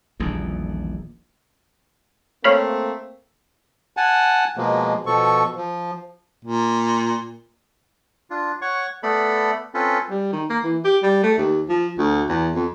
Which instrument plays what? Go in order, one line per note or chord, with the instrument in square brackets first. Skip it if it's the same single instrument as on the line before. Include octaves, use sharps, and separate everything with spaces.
[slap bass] D#1 A#1 E2
[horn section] A3 A#3 C4 [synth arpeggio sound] C#5 F5 B5
[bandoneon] F#5 G#5 A5
B2 F3 G#3 A#3
B2 F3 A4 C#6
F3
[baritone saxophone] A#2
[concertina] D4 F4
C#5 F#5 C#6
A3 B3 A4 D5 B5
C4 C#4 F4 A4 B4
[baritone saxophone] G3
D#3
A#3
E3
G4
G3
A3
D#2
F3
D2
E2
F2